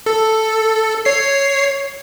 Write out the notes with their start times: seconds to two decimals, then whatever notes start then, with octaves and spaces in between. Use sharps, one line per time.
0.06 A4
1.05 C#5 C7